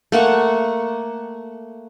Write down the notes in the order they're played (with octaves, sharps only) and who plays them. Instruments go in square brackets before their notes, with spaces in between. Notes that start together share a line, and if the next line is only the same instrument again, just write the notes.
[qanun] A3 A#3 F#5 C#6